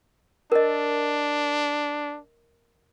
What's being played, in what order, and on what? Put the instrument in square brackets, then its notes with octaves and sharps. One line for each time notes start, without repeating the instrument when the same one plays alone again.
[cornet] D4 [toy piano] A#4 D#5